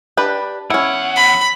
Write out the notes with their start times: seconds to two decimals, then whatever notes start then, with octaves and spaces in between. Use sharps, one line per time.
0.17 D4 G4 B4
0.70 E2 C#4 E4 F#5
1.16 B5